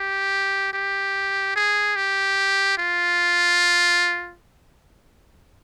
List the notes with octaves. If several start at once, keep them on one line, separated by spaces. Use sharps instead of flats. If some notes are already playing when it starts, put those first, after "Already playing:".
Already playing: G4
G4
G#4
G4
F4